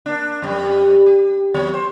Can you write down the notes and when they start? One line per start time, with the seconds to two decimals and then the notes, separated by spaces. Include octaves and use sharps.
0.06 A#3 D4
0.42 F2 G3
1.06 G4
1.54 D#2 F#3 C#5
1.74 C5